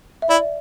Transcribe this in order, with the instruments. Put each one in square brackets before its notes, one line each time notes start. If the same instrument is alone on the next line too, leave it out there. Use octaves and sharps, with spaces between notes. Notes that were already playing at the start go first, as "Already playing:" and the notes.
[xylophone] E5
[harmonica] E4 [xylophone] D5